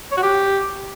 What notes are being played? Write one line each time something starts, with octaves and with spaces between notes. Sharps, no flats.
C#5
F#4
G4